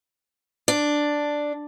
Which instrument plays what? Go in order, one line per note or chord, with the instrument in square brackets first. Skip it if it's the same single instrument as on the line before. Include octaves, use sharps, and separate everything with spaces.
[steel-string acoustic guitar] D4